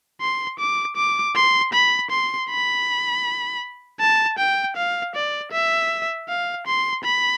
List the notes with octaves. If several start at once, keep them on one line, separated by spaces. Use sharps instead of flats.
C6
D6
D6
C6
B5
C6
B5
A5
G5
F5
D5
E5
F5
C6
B5